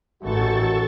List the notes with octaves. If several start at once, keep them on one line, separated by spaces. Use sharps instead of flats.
A1 D#3 F#4 A4 C#6 A6